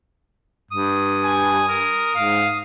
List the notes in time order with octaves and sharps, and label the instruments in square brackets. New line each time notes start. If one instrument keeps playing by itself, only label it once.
[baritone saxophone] G2 [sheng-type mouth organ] D#6
[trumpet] G#5
A#4
[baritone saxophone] G#2 [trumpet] F5